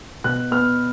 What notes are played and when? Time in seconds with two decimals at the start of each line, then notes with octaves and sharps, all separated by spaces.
0.24 B2 F#6
0.51 B3 F6